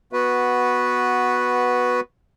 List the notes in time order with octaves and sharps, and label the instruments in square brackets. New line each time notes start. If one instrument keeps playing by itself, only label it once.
[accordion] B3 F#4 B4